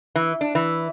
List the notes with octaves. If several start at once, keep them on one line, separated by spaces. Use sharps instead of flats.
E3
D4
E3